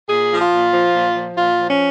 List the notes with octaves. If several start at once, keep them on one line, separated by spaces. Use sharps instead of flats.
A#2 G#4
F3
F4
A#2
F3
A#2
F3
A#2 F4
F3
C#4